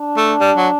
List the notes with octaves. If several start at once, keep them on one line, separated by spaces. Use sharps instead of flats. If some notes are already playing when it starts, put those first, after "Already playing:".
Already playing: D4
A3
G3
F#3